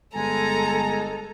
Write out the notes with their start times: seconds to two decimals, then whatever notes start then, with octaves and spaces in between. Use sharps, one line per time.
0.15 G1 G#3 A4 G#5 A#5